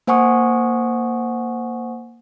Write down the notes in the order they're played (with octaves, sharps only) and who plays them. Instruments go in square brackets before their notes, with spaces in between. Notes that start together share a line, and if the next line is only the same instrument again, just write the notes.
[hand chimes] A#3 C5 F#5 G#5 C#6 D#6